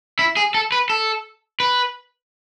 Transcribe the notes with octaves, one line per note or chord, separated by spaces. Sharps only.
E4
G#4
A4
B4
A4
B4